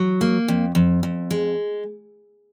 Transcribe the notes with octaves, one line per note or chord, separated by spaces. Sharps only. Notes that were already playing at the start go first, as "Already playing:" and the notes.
Already playing: F#3
A#3
F2
F2
F2
G#3